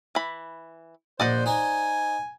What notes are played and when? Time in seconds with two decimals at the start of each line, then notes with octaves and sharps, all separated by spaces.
0.15 E3 B5
1.20 A#1 C5 D5 D#5 F#5
1.46 D#4 C5 G#5